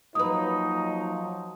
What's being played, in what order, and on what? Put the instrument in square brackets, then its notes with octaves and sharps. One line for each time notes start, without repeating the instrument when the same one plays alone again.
[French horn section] F3 F#3 [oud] A#3 B4 [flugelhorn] D#4 [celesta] D#6